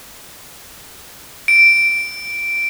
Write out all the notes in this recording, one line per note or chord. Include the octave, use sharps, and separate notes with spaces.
D7